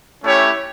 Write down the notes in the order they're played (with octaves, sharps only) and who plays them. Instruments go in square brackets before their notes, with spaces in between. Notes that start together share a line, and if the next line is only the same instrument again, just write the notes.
[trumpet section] A3 C#4 E4 G4 C#5